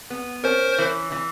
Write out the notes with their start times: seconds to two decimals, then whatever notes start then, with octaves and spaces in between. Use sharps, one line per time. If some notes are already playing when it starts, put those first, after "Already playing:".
0.10 B3
0.44 C#4 A#4 C5
0.78 E3
1.12 E3